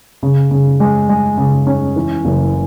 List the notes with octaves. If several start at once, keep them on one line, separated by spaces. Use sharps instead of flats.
C#3
C#3
G#3
G#3
C#3
C#4
E3
F#1